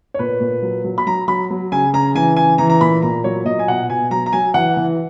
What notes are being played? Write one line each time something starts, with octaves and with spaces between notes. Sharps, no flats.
C#5
A#2 B4
A#2
F#3
F#3
B5
F#3 A#5
F#3 B5
F#3
C#3 G#5
C#3 A#5
E3 G#5
C#3 G#5
E3 A#5
A#5
A#2 B5
A#2 A#5
F#3 C#5
A#2 D#5
G#5
B2 F#5
B2 G#5
F#3 A#5
A#5
F#3 G#5
E3 F#5
E3